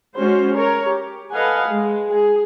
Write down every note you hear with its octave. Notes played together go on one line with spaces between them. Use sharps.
G#3 C#4 F#4 C5
A#4 C#5
G4
A4 B4 D#5 F5 F#5 G#5
G#3
G#4